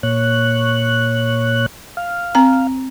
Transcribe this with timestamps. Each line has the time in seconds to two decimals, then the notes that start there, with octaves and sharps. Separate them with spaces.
0.03 A#2 C#5 F#6
1.97 F5
2.35 C4 A#5